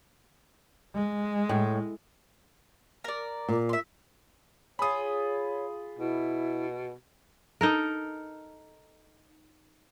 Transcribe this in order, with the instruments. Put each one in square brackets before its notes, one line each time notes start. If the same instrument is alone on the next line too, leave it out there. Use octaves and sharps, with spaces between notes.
[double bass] G#3
[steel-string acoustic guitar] A2
[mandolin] A#4 D5
[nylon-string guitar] A#2
[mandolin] E5 C6
[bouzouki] F4 G#4 [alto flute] C#5 [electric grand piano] B5 D#6
[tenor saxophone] B2 [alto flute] E4
[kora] D#4 A4 A#4